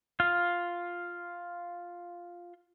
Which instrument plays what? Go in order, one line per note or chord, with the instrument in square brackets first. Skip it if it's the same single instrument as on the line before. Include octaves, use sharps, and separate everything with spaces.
[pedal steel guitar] F4 F5